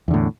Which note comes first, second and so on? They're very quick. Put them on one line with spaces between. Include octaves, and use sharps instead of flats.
E2 D3 A2